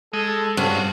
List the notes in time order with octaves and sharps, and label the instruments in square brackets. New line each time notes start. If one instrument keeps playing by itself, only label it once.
[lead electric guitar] G#3 [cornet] A4
[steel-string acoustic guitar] G2 [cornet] C#4 [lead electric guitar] F4 F#4